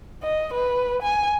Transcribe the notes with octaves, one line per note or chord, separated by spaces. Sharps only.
D#5
B4
G#5